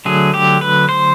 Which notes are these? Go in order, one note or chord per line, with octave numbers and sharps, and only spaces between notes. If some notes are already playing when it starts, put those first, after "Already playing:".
D3 F#3 A3 G#4
G4
B4
C5